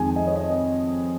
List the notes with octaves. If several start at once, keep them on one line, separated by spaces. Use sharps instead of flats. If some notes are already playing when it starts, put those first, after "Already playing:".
Already playing: F2 D#3 G#3 G#5
D#5
C#5
D#5